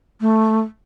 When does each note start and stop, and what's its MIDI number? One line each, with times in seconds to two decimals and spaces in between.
0.21 0.60 57